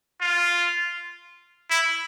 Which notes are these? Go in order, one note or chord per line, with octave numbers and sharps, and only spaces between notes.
F4
E4